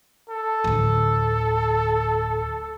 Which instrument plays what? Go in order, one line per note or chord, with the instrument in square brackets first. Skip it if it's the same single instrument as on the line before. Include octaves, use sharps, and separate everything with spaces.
[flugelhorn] A4
[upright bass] D1 D2